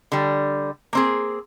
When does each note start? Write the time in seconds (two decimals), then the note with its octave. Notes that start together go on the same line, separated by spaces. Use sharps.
0.12 D3 G3
0.93 A#3 C4 G#4